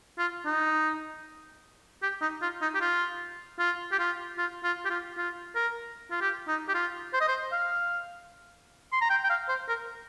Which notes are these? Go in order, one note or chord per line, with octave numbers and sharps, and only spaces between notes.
F4
D#4
G4
D#4
F4
D#4
G4
F4
F4
G4
F4
F4
F4
G4
F4
F4
A#4
F4
G4
D#4
G4
F4
C5
D#5
C5
F5
C6
A#5
G5
G5
F5
C5
A#4